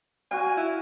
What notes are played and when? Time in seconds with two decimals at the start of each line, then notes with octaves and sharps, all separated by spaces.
0.31 F#4 F5 G#5
0.57 E4